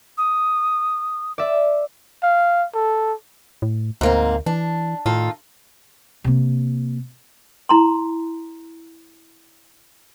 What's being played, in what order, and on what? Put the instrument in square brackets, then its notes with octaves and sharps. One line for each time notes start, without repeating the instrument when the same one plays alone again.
[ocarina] D#6
[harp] D5 E5
[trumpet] F5
A4
[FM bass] A2
[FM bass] D2 [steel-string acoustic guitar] G#2 A#3 C4
[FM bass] E3 [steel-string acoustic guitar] D4
[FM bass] A2 [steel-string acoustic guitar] D#3 F4 A4
[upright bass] C3 A#3
[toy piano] E4 A#5 C6